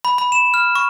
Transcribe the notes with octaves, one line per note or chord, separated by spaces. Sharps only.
B5
B5
E7
F6
C#6